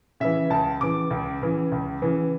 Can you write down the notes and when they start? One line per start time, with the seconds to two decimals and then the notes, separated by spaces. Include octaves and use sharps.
0.20 C#3 E3 E5
0.50 C#2 A5
0.81 C#3 E3 D6
1.11 C#2
1.42 C#3 E3
1.72 C#2
2.02 C#3 E3